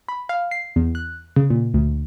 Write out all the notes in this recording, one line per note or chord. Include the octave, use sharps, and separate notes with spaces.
B5
F5
C7
E2
F#6
C#3
A#2
D2